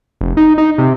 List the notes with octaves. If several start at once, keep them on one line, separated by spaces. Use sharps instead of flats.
F1
D#4
D#4
C3